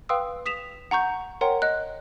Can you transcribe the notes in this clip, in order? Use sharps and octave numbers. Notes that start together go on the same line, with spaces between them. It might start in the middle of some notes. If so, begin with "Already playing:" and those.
B4 F5 G5 C6 D#6 E6
D#6 B6 E7 F7
F#5 A#5 C#6 G6
A#4 C#5 F#5 G5 A#5 C6
D#5 F#6